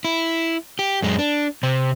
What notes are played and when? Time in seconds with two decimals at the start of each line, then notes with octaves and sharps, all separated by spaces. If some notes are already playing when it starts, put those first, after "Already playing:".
0.05 E4
0.79 G4
1.03 F#2 G#3
1.19 D4
1.63 C3 C4